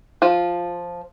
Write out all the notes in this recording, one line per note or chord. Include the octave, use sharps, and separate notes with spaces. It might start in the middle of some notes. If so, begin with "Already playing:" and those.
F3 F4